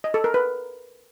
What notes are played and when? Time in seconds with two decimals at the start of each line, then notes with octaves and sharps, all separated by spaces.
0.04 D#5
0.14 A4
0.24 A#4
0.34 B4